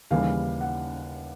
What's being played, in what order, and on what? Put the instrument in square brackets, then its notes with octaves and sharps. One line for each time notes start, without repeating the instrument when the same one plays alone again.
[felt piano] D#2 C#3 E3 G3 F5
F#5